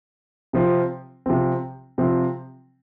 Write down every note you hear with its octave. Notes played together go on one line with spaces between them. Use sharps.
C3 F3 C4
C3 F3 C4
C3 F3 C4